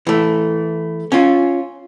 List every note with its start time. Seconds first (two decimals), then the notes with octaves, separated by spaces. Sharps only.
0.07 E3 A3
1.12 C#4 F4